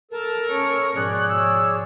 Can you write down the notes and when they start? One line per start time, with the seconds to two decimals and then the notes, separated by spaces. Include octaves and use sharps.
0.11 A4 A#4 A5
0.46 C#4 C#5 C#6
0.96 G#2 B2 F3 G#4 C#5 D5 F#6
1.29 E6